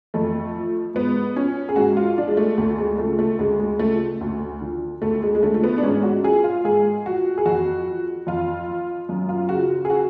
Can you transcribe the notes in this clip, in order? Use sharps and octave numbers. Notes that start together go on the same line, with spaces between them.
F2 A3
F3
G#2 B3
F3 C#4
G#4
G#2 F#4
F4
F3 D4
G#3
A3
D2 A3
G#3
C#3 F3 A3
A3
D2 G#3
G#3
C#3 F3 A3
D2
D3 F3
D2 A3
G#3
G#3
D3 F3 A3
A3
B3
D4
G#2 C#4
F#4
F3 G#4
F4
G#2 G#4
F3 F#4
G#4
F2 F#4
F3
F2 F4
F3
F#2
F4
C#3 F3 F#4
G#4
F#4